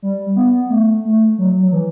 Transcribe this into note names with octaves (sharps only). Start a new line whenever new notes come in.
G3
B3
A3
A3
F#3
F#3
E3